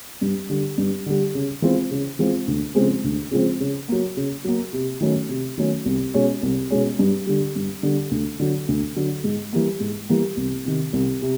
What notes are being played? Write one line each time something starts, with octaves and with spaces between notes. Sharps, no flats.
G2
D3 G3
G2
D3 G3
C#3
E3 G#3 C4 F4
C#3
E3 G#3 C4 F4
D2
C#3 F3 G#3 C4
D2
C#3 F3 G#3 C4
C#3
F#3 A#3
C#3
F#3 A#3
C3
D#3 F#3 A3 C#4
C3
D#3 F#3 A3 C#4
C2
B2 G#3 C#4
C2
B2 G#3 C#4
G2
D3 G3
G2
D3 G3
D2
D3 F#3
D2
D3 F#3
G#2
E3 G3 A#3
G#2
E3 G3 A#3
C2
C3 D#3
C2
C3